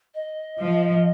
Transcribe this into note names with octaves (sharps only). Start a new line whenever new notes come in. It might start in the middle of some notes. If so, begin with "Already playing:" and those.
D#5
F3